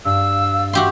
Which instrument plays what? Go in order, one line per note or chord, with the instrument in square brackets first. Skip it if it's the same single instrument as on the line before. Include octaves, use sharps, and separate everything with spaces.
[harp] G2 [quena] F5 [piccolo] E6
[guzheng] F#4 G4 C6 [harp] E6 G6